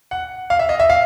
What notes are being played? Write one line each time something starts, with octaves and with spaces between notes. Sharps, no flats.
F#5
F5
E5
D#5
E5
F5